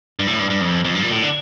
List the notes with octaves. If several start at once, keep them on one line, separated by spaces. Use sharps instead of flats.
G2
A2
G2
G2
F2
F2
G2
A#2
A2
D3